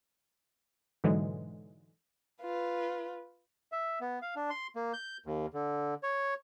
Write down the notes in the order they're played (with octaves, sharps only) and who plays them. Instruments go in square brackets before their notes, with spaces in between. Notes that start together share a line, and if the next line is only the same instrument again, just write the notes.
[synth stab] G#2 B2 D3 E3 F#3 G#3
[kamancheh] F4 B4
[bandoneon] E5
B3
F5
D4
C6
A#3
G6
D#2
D3
C#5